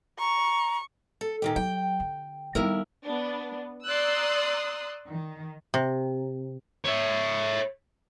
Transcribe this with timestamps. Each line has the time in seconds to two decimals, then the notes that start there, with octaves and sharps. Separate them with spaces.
0.19 A#5 C#6
1.21 A4
1.42 A#2 D#3 G4
1.56 F#3 G5
2.00 D3
2.55 D#2 G3 B3 E4 A#4
3.03 B3 D4
3.87 D5 A#5 C6 D#6 E6 F#6
5.09 D#3
5.74 C3
6.86 C#5 E5